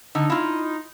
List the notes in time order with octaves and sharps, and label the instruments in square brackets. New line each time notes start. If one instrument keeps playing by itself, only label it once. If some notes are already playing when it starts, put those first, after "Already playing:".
[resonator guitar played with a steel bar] D3 [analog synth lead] D#4
[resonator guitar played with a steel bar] E4 F4